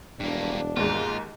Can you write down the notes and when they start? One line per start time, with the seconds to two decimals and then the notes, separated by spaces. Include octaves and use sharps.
0.20 E1 G2 A#3 D4
0.76 D#2 G#2 F4